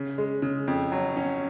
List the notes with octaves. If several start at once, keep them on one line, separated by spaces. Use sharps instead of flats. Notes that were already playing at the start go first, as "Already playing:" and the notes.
Already playing: C#3
G#3
C#3
F2
F#3
C#4